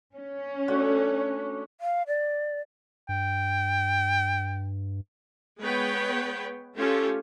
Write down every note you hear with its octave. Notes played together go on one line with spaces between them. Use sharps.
C#4
A3 D4 F#4
F5
D5
G2 G5
G#3 B3 B4 C#5 G5
A3 C#4 F4 G4 A4